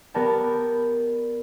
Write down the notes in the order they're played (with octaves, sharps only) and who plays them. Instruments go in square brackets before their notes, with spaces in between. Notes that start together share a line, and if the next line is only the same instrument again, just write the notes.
[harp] B3 G4 A#4 D5 A5